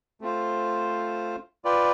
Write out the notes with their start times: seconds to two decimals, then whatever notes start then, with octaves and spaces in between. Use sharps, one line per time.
0.21 A3 C4 F4 C5
1.65 F4 B4 D5 G5